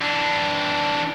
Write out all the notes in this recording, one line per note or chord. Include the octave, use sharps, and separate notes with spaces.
E3 D4